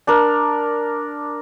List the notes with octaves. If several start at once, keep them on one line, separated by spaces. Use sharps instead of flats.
D4 A#4